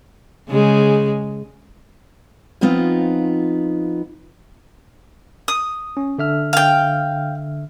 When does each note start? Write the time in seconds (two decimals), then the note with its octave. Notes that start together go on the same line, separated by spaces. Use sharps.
0.49 C#3 G#3
2.61 F3 B3 C4 D#4 F4
5.48 D#6
5.97 C#4
6.18 D3 E5 F6
6.53 F5 G5